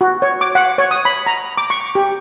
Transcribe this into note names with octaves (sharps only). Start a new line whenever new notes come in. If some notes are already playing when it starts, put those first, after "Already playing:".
F#4
C#5
D6
F#5
C#5
D#6
B5
A#5
D6
C#6
G4